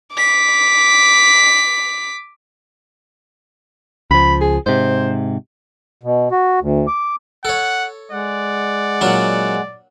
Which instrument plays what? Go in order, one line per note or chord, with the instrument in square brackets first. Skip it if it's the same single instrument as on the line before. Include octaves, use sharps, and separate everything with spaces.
[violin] D6 B6
[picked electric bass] C#2 F3 [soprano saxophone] B5
[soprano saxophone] G#4
[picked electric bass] G#2 C3 [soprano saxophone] C5
[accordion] B2
F#4
D2
D6
[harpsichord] A4 C#5 [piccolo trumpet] F#5
[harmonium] G#3 F#5 [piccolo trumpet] D5
[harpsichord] A#2 F#3 D4